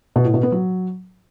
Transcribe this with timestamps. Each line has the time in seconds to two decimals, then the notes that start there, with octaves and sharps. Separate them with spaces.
0.16 B2
0.25 A2
0.34 B2
0.43 B3
0.52 F#3